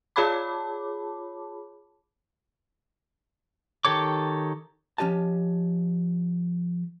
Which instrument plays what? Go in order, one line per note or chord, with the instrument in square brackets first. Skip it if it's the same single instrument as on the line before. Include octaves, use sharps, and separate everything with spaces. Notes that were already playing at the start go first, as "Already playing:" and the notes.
[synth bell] F4 G#4 C#5 A5 B5 D6
[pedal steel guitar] D#3 G4 A4 C#5 D6
[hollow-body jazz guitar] F3 C#4 G4 D#5 A5